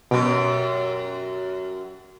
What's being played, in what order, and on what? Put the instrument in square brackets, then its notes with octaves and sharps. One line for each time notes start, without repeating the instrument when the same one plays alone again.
[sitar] F#2 G4 [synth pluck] B2